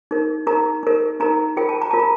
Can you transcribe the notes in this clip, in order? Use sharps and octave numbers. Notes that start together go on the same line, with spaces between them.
D#4 A#4
D#4 A#4 A#5
D#4 A#4
D#4 A#4 A#5
F4 A#4 G5
A5
A#5
F4 A#4 A5
A#5